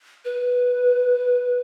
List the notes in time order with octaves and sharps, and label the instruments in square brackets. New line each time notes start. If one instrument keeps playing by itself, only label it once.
[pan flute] B4